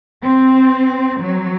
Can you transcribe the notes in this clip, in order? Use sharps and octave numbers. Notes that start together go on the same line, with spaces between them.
C4
F#3